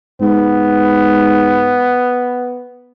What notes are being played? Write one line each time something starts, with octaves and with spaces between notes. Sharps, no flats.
G#2 B3